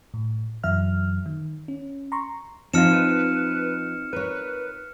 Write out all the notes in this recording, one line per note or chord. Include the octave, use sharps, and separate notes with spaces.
A2
F#2 E3 F#3 E5 F6
D#3
C#4
A#5 C6 C#6
G#2 F3 C4 D#4 F4 F6 C#7 E7
B4
A#4 B4 C#5